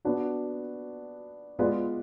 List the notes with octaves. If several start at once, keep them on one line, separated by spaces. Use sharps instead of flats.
B3 D4 F#4
G#3 B3 F4 B4 D5